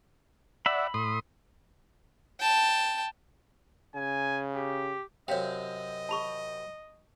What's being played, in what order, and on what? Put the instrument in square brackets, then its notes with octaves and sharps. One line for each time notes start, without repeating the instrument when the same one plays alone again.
[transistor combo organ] D5 E5 F#5 [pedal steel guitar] B5 E6
[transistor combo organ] A2 C6 D#6
[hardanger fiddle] G5 A5
[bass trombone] C#3 [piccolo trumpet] G#5
[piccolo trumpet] G4
[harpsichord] F#2 C3 [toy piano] C#5 F5 G5 [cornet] D#5
[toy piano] A5 B5 C#6